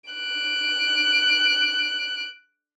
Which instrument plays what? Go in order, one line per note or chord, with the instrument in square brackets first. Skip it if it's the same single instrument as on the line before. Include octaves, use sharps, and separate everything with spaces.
[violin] F#6 D7